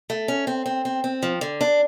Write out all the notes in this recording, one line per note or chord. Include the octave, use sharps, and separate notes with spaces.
A3
C#4
C4
C4
C4
C4
F3
D3
D4